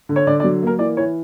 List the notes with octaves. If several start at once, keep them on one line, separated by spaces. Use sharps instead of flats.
D3
C#5
D3 D5
D5
F#3
A#3 A#4
E3 D5
E3 C#5